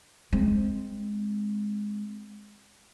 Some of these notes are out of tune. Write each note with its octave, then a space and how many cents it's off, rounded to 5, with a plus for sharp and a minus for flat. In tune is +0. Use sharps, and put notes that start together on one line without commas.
G#3 +0 C4 +0